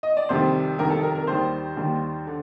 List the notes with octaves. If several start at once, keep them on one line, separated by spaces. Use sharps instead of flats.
D#5
D5
F2 C3 D#3 G3 C5
F2 C3 D#3 G3 A#4
A4
A#4
A#4
D#2 D#3 G3 C5
D#2 D#3 G3
D3